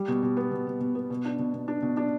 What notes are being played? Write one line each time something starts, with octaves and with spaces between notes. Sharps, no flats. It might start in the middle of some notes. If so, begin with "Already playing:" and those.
Already playing: G3
B2
B2
B3
B2
B2
B2
B3
B2
D4
B2
B2
D4
B2
D4